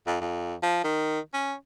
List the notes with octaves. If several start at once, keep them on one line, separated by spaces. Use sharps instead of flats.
F2
F2
F3
D#3
C#4